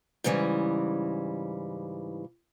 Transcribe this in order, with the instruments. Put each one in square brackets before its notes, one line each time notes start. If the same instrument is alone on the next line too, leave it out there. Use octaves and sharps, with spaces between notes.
[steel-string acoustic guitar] G#2 C#3 E3 G3